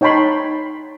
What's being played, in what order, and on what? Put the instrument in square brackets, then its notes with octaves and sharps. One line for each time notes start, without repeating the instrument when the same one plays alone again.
[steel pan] D#4 C#5 G5 A5 B5 C6